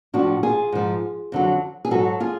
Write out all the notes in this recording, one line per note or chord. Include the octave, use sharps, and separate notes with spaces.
A2 F3 D4 F#4
F4 G#4
G#2 F3
F2 D3 F#3
G#4
G#2 F#3 F#4 A4
F4 G#4